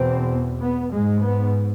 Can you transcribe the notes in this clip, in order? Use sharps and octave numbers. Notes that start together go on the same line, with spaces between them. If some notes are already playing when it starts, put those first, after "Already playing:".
Already playing: E2 B2 C4
B3
G#2 G#3
B3